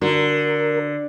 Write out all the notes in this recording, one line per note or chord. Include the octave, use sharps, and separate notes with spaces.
D3 F#4 A#4